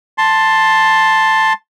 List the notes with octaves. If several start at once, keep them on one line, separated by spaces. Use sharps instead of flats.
A5 C6